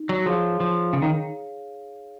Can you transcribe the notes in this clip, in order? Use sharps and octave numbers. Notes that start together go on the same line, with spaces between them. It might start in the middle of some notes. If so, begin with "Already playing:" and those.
Already playing: D#4
F#3
F3 G#4 C#5 F5
F3
C#3
D#3